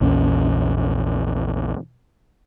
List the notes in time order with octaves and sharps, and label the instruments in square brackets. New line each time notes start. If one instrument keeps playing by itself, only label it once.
[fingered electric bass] A#1 E2 C#4